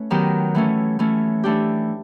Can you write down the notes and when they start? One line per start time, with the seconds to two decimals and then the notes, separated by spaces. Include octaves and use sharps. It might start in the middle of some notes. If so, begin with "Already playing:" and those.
Already playing: A3 C#4 B4
0.10 D#3 F#3 B3 D#4 G4
0.55 E3 A3 C#4
0.99 E3 A3 C#4
1.44 E3 A3 D4 G4